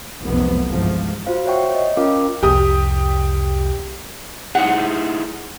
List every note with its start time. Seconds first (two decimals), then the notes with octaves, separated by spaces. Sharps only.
0.22 F1 C2 F#2 B3
0.69 G1 E2 G#2 F3
1.26 F4 F#4 C5 F5
1.46 C5 C#5 E5 F#5 G5 C#6
1.71 C#5 D#5
1.97 C#4 F4 A#4 F5 G5 D6
2.43 C2 F2 G4 D#6
4.55 D#4 E4 G#4 F#5